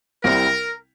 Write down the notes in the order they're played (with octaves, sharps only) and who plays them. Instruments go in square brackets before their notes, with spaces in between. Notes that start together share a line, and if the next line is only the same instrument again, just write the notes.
[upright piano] C2 C3 G3 C4 E4 [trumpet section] A#4